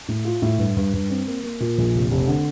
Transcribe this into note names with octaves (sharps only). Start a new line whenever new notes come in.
A2
F4
A2
G2
G2
G2
C4
A#3
A#3
A#2
A#1
F1
F1
D3